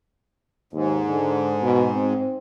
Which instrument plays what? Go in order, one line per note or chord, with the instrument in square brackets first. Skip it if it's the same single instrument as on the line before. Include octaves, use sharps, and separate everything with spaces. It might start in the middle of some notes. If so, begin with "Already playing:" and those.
[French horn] D#2 [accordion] G#2
[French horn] D3
B2
C4